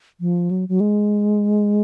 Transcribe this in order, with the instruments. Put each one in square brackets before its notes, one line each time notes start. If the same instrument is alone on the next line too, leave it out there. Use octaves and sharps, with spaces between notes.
[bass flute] F3
F#3
F#3
G#3